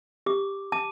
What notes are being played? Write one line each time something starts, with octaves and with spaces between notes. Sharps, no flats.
G4 D6
A5 D6